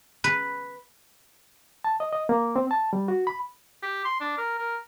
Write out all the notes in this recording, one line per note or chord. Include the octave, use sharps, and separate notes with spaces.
B4
A5
D#5
D#5
A#3
C4
A5
G3
F#4
B5
G4
C6
D4
A#4
A#4